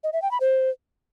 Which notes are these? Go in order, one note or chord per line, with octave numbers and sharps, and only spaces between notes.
D#5
E5
G5
B5
C5